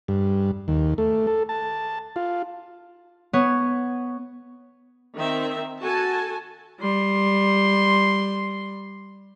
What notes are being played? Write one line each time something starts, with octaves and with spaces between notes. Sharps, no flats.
G2
D#2
A3
A4
A5
F4
B3 C#5
D#3 C4 E5
F#4 A4 G#5 A5
G3 C6